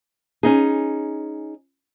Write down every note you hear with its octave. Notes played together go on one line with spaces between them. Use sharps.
C#4 D#4 G#4